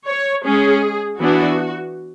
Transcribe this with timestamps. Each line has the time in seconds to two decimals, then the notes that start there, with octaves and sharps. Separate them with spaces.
0.08 C#5
0.45 G#3 C#4 G#4
1.19 E3 B3 D4 F#4